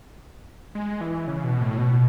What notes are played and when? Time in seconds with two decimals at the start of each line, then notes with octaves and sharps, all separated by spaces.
0.75 G#3
1.01 E3
1.27 C#3
1.44 B2
1.61 A2
1.78 B2